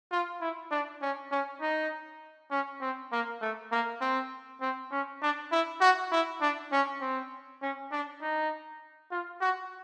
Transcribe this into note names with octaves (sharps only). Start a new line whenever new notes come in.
F4
E4
D4
C#4
C#4
D#4
C#4
C4
A#3
A3
A#3
C4
C4
C#4
D4
E4
F#4
E4
D4
C#4
C4
C#4
D4
D#4
F4
F#4